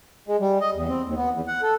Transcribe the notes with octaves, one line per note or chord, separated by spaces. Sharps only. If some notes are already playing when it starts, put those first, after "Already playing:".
G#3
G3
D#5
E2
C4
D#2
B3
E2
F#5
A4